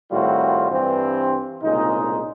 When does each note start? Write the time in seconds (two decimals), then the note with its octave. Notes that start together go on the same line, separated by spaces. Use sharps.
0.12 A2 D#3 G3 C4 F4 F#4
0.71 G2 E3 C4
1.63 C2 A#2 C#3 G#3 D#4